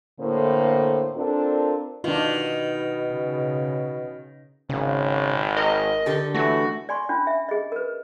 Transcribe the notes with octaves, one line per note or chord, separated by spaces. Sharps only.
A2 D3 A#3 C5
C4 D4 F4 A4 A#4
B2 D#3 D4 F4
C#3
G#1 C#3
A#4 D#5
D3 G4 A4
E3 A3 F#4
D5 G#5 C6 C#6
C#4 D4 F4
E5
G#4 D#5
A#4 B4